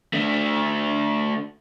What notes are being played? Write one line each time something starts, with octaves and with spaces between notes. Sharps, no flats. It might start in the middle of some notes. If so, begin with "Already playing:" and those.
A3 D4